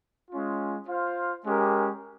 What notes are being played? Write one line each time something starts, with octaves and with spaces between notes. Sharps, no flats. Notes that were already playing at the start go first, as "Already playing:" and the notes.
G#3 C#4 F4
F4 C5 F5
G#3 C#4 G4 A#4